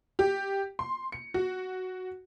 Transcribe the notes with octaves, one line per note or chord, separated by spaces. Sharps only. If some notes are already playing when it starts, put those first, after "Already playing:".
G4
C6
C#7
F#4